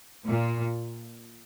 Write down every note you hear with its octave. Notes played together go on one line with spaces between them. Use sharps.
A#2